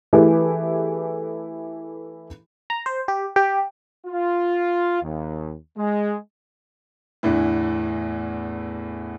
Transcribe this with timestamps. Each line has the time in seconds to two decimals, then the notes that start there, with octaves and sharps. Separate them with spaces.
0.13 E3 A3 E4 G4 G#4 B4
2.70 A#5
2.86 C5
3.08 G4
3.36 G4
4.07 F4
5.03 D#2
5.77 G#3
7.23 E2 A2 D3 E3